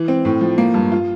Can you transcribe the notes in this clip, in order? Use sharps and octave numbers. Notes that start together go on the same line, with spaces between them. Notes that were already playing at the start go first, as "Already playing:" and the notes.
Already playing: E3
C4
A2
F3
A#3
G2
F4